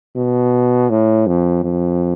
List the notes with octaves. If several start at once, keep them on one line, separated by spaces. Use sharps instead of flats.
B2
A2
F2
F2